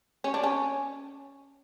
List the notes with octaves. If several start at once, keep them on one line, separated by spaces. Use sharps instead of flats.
C#4
D4
C#4